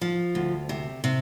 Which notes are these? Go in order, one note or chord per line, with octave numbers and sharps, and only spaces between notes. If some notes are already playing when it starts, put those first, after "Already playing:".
F3
D2
C3
C3